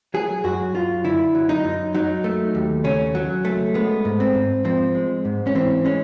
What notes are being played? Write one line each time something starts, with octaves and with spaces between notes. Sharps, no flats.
F#3 G#4
F#2 F#4
F#2 F4
D3 E4
F#3
D#4
F#2
F#3 D#4
A3
D#2
C#3 C#4
F#3
A3
G#3 B3
G#2
C4
G#2
F3 C4
G#3
G#2
C#4
E3 C4
G#3 C#4